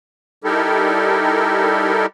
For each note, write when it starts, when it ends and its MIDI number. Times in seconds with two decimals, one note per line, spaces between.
0.44 2.06 55
0.44 2.06 63
0.44 2.06 64
0.44 2.06 67
0.44 2.06 69
0.44 2.06 70